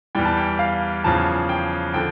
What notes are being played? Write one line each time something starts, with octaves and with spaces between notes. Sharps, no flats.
E2 E3 G3 G5
A5
G5
F5
E2 C#3 F3 A5
G5
D3 F3 G5